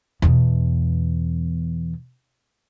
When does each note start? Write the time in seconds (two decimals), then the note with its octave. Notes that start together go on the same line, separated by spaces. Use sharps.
0.22 E2 B2